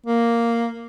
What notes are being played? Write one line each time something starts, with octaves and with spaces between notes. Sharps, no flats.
A#3